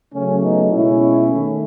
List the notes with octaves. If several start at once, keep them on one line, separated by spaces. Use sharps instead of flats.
C#3 F#3 A3 C#4
B3 D#4
B2 G#3 C#4 E4
A3
D#3